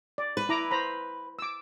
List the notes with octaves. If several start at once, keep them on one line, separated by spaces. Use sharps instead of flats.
D5
B4
E4 A#5 D6
C5 A#5 B5
D6 E6